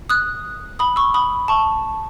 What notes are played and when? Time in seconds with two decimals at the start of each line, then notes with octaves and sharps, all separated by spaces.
0.10 D#6 F#6
0.79 B5 D#6
0.96 C#6 E6
1.14 B5 D#6
1.48 A5 C#6